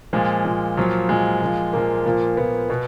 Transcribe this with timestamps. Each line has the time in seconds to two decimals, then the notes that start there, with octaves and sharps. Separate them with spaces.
0.13 A#2 F3 G#3
0.45 A#2 F3
0.77 A#2 F3 F#3
1.09 A#2 F3 G#3
1.42 A#2 F3
1.73 A#2 F3 A#3
2.06 A#2 F3
2.37 A#2 F3 B3
2.70 B2